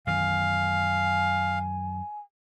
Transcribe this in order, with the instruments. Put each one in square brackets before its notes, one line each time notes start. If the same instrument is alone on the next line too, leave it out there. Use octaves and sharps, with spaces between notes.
[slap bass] F#2 D#3 E3 [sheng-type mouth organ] F5 [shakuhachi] G#5